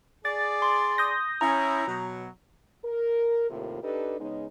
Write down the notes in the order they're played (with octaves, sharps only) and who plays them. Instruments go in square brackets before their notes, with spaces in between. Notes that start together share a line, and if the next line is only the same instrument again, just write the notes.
[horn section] G#4 D5 [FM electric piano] A6
[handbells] C6
[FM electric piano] D#6 G6 A#6
[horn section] C#4 E4 [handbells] A#5
[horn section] B2 F#3
[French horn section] A#4
D#2 A2 C3 F4 A#4
D4 D#4 G4 A4 B4
C#3 G#3 B3 C#4 D#4